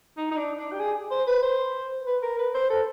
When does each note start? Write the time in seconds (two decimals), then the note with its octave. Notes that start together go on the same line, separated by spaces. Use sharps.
0.17 D#4
0.31 D#4
0.37 D4
0.59 D4
0.73 G4
0.80 G#4
1.11 C5
1.27 B4
1.43 C5
2.06 B4
2.23 A#4
2.39 B4
2.54 C5
2.70 A4